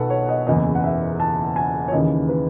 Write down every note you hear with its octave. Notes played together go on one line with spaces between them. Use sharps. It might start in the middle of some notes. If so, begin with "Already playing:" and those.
Already playing: B1 B2 A4 B4 F#5
C#5
D#5
F#1 E2 C#3 E3 D#5
F#5
E5
A5
G#5
C#5
D#2 C#3 E3 D#5
B4